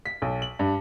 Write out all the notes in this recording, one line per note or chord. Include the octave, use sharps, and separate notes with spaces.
B6
B1
F#7
G2